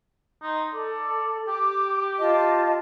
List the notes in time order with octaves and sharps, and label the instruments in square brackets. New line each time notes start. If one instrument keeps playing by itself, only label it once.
[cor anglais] D#4 [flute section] C6
[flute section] A4 [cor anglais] D5
[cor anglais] G4 [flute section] D6
[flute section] F4 D#5 A5